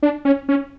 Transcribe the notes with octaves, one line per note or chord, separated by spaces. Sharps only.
D4
C#4
C#4